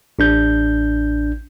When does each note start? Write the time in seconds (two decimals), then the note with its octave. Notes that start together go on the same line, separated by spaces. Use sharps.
0.19 A1 D4 G6